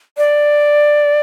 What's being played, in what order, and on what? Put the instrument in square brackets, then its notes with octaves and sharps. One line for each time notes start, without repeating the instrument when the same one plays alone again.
[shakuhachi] D5